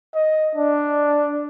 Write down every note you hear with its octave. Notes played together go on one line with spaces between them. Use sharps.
D#5
D4